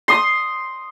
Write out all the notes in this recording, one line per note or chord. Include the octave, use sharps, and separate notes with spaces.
C6 D#6